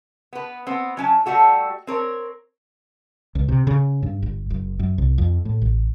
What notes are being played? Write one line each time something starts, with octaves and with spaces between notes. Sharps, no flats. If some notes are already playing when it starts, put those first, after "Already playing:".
B3 B4
B3 C4
F#3 C#4 A5
G3 A3 F#4 A4
C4 A#4 C#5
C#2
C3
C#3
G2
G1
F#1
F#2
C2
F2
A2
A1